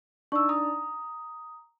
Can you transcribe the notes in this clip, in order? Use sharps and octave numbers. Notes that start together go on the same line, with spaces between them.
D4 D#4 D5 C#6 E6
A#5 D#6